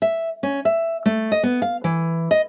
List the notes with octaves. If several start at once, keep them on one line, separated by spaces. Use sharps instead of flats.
E5
C#4
E5
A3
D#5
B3
F5
E3
D#5